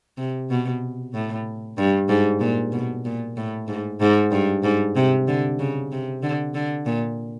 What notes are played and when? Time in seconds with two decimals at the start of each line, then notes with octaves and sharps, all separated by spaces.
0.18 C3
0.50 B2
1.14 A2
1.78 G2
2.09 G#2
2.40 A#2
2.72 B2
3.05 A#2
3.37 A2
3.68 G#2
4.01 G#2
4.32 G2
4.64 G#2
4.96 C3
5.28 D3
5.59 C#3
5.92 C3
6.23 D3
6.55 D3
6.86 A#2